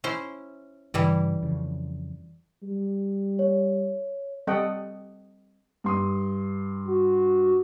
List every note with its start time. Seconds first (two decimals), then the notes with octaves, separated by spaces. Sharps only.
0.04 C#4 E4 C5
0.94 G2 C#3 E3 G3 E4
1.43 F2 C#3
2.63 G3
3.39 C#5
4.47 G3 C4 A4 D#5 F#5 G5
5.84 G2 C6 D#6
6.88 F#4